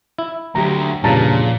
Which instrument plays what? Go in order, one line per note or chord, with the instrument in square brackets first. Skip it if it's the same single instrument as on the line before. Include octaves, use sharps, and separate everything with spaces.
[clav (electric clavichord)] E4
[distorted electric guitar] D2 [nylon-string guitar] F#3 G4 [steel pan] A#5
[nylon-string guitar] E2 F3 [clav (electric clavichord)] G2 C#3 [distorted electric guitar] A#2 [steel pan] A5 A#5